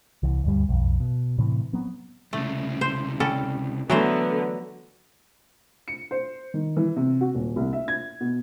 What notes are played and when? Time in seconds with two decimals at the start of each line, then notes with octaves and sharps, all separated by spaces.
0.23 C2 E3
0.44 D2 G2 G3
0.69 B1 F2
1.00 B2
1.38 A2 C3 E3
1.73 F#3 B3 C4
2.33 C2 C#3 A3
2.81 C5
3.20 G3 C#4 A4
3.90 D3 E3 F#3 A3 B3 C5
5.88 C#7
6.11 C5
6.54 D#3
6.77 E3
6.96 C3
7.21 F#4
7.35 D#1
7.56 C2
7.73 E5
7.88 G#6
8.21 B2